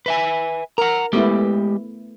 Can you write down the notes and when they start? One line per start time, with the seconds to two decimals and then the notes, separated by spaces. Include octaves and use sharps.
0.06 B4 E5 G#5
0.78 A#4 F#5 A#5
1.13 G#3 A3 B3 E4 G4